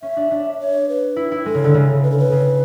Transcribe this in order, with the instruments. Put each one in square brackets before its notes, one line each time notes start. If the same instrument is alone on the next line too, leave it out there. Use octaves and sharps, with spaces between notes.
[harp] C#4 [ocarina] E5
[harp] D4
D4
[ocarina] C#5
B4
[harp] E4
E4
[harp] G#3 [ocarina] A4
[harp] C#3
D3
C#3
[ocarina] B4
A4
B4
[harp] C#3